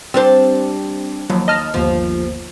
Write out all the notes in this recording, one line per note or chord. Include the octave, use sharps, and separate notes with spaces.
G3 C4 D4 C5
D#2 F3 F#3
D#5 A5 F6
G1 D#2 F3